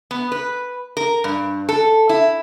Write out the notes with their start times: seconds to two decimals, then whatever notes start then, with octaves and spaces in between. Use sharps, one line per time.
0.11 B3
0.32 B4
0.97 A#4
1.24 G2
1.69 A4
2.09 E4